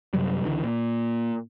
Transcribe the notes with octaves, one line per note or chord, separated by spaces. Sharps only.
F#2 C3 F#3 G3
C#2 D3 E3
A#2